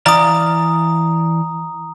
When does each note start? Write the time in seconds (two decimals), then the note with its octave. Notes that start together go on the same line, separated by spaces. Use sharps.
0.06 E3 D5 F5 A#5 D#6